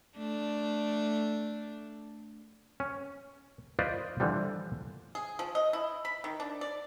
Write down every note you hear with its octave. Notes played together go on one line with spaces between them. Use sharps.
A3 D4
C#4
F4 B4 C5 D5 D#5
D3 E3 F3 G3
G#4
F3
D#5
E4
B5
D#3
D4
D5